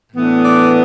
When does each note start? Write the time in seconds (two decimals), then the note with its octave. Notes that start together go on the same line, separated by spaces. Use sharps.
0.13 A2 E3 B3 D4
0.44 D5